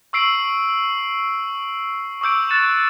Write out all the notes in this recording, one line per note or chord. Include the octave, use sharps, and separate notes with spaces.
C#6 E6 C7 D7 F#7
C#6 D6 E6 G6 D7
F6 F#6 A6 C#7 D#7 E7